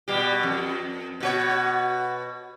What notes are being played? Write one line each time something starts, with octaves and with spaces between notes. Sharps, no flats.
B2 G3 G4
F2
B2 F#4 C#5